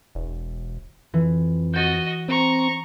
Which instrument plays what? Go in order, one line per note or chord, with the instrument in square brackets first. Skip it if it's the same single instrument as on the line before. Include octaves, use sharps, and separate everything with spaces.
[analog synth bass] E1
[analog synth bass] F2 [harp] E3
[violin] F#4 D#5 [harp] G6 A6 A#6
[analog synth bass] C4 [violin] A#5 C#6